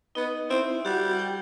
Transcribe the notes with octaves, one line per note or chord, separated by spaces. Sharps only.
B3 D#4 D#5
C4 E4 E5
G3 F#4 F#5
G4 G5